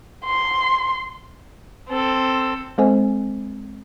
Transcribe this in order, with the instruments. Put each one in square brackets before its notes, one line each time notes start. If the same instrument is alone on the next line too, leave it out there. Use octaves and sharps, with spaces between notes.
[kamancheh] C6
[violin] C4 A4
[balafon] G#3 C4 A4 C5 D#5 G#5